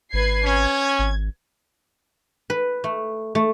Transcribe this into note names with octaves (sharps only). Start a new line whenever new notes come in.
G#1 B4 G#6 C7
C#4 G#6
G#1
B4
A3
A3